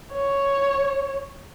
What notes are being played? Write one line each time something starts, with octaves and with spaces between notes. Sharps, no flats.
C#5